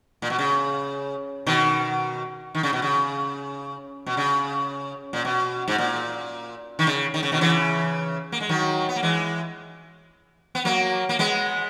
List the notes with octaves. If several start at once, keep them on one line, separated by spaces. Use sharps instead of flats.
A#2
B2
C#3
B2 D#3
D#3
C#3
B2
C#3
B2
C#3
A#2
B2
G#2
A#2
D#3
C#3
D#3
C#3
B2 D#3
C#3 E3
A#3
G#3
D#3 F#3
B3
A#3
E3 G#3
B3
F#3 A#3
A#3
G#3 B3